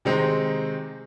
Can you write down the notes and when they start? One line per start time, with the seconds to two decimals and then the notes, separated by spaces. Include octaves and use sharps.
0.05 C3 D#3 G#3 C4 D#4